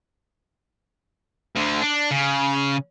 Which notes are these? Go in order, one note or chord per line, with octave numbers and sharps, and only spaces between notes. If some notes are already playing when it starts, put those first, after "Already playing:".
D2 D3
D4
C#3